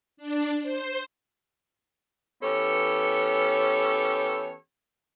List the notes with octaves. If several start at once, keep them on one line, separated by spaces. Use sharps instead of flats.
D4
C5
E3 B3 C#4 G4 A4 C#5